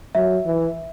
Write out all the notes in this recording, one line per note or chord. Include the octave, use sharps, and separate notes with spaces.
F#3 E5
E3